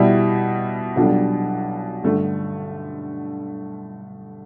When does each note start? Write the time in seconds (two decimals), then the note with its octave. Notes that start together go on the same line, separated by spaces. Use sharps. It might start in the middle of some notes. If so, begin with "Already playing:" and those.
Already playing: B2 G3 E4
0.96 B1 B2 G3 D4 A4
2.03 G2 D3 A3